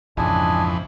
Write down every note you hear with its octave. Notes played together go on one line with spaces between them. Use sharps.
A#1 F2 G#2 C#3 E3 D4 D#5 G#5